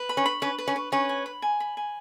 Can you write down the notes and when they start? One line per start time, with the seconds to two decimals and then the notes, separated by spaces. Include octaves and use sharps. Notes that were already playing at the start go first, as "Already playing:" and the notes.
Already playing: B4
0.09 B5
0.17 C#4
0.26 B5
0.42 C#4 B4
0.58 B4
0.68 C#4
0.76 B4
0.92 C#4 B4
1.09 G#5
1.26 B5
1.42 G#5
1.60 B5
1.77 G#5